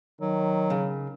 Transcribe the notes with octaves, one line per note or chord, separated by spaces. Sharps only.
D#3 F#3
C#3